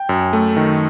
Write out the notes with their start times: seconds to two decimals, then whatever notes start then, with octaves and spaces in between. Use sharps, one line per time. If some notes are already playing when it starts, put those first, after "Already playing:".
Already playing: G5
0.09 F#2
0.33 A3
0.57 D#3